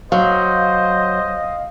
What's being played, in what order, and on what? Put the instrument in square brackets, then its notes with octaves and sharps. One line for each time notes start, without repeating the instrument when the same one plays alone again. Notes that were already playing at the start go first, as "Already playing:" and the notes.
[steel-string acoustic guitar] F#3 [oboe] C5 [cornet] D#5 [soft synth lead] F5